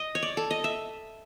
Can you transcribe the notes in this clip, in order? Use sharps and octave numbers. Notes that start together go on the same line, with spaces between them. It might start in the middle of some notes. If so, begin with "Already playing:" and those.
Already playing: D#5
C#5
D5
A4
D#5
E5